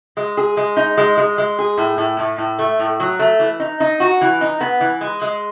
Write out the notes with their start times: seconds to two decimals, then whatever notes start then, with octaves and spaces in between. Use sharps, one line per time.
0.17 G#3
0.37 G#4
0.57 G#3
0.77 D#4
0.97 G#3
1.17 G#3
1.38 G#3
1.59 G#4
1.78 A2
1.98 A2
2.19 A2
2.38 A2
2.59 A3
2.79 A2
3.00 F#3
3.19 A3
3.39 E3
3.60 D#4
3.80 D#4
4.00 F#4
4.21 E3
4.41 D#4
4.61 B3
4.81 E3
5.01 G#3
5.22 G#3